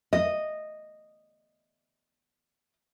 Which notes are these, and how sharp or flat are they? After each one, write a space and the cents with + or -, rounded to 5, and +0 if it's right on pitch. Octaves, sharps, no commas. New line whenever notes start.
D#5 -10